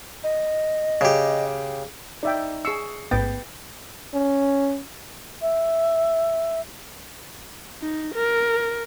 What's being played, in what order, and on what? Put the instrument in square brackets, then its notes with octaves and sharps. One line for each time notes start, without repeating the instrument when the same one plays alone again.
[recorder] D#5
[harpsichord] C#3 G4
[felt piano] D#4 [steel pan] D5 E5 G5
[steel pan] G#4 E6 [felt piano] C#6 C7 C#7
[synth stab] A1 G#2 B3 [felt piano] B4 A6 [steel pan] G5
[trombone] C#4
[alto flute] E5
[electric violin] D#4
A#4